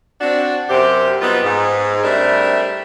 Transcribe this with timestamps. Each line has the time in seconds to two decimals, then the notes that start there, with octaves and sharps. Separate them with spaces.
0.20 C4 D4 F#4
0.68 F#2 C3 G4
1.22 F#3 G3 B3 C4 D#4 F4
1.42 G#2
2.03 G3 A3 C4 D4 E4 A#4